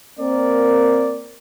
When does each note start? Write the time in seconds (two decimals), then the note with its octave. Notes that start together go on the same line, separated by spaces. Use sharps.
0.19 A#3 C4 A#4 D5